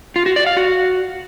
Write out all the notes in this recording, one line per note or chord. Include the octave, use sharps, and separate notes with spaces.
F4
F#4
D5
F5
F#4